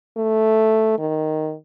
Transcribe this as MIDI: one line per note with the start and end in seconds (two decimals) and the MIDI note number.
0.17 0.94 57
0.99 1.55 51